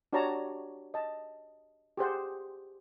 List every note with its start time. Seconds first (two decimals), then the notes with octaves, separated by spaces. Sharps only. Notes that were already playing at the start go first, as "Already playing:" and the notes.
0.13 D4 F#4 G4 C#5 A5 A#5
0.94 D#5 A5
1.97 G4 G#4 C5 F#5